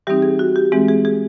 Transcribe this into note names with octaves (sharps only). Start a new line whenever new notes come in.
E3 G3 C4 D#4 G4
G#4
F#4
G4
E3 G#3 C4 G#4
G#4
G#4